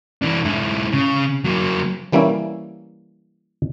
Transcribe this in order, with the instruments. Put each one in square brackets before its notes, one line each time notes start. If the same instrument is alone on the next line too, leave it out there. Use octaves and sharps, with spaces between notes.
[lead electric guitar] E3 D4
G#2 E4
C#3
F#3 A#3
[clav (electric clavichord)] E3 G3 A#3 C#4 E4